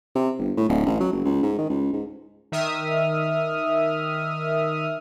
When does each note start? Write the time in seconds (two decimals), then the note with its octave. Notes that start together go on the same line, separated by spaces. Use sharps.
0.15 C3
0.39 G1
0.57 A2
0.69 D1
0.86 A1
1.00 F#3
1.12 F#1
1.25 C#2
1.43 G#2
1.59 D#3
1.70 C#2
1.93 G#2
2.52 D#3 E5 D#6 F6